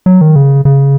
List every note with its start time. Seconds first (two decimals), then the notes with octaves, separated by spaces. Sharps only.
0.06 F#3
0.21 D#3
0.36 C#3
0.65 C#3